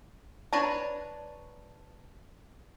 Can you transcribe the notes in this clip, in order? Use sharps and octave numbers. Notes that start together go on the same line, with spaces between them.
D4 B4 C#5 A#5